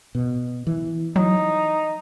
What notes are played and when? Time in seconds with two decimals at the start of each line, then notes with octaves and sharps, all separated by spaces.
0.15 B2
0.67 E3
1.16 F#3 D#4